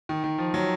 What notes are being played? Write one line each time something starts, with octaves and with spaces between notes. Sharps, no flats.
D#3
D#3
F3
F#3